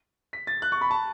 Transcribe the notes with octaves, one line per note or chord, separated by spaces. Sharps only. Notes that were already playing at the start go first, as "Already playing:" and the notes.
B6
A6
F#6
C#6
B5
A5